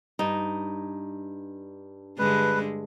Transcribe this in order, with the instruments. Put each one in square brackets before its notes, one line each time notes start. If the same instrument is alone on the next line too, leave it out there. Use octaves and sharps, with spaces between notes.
[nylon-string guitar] G2 [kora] D#4
[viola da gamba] G2 D3 G#3 [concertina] B4